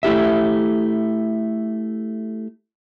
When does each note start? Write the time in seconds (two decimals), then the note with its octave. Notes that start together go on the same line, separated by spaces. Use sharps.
0.03 A3 E4 G4 E5